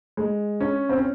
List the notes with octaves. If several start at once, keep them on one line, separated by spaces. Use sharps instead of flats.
G#3
C#4
C4
C#4